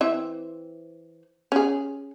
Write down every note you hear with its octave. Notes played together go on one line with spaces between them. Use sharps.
E3 C4 E5
C#4 G#4